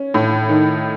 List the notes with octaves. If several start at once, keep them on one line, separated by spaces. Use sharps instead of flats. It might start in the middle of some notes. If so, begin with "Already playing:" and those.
Already playing: C#4
A2
D#3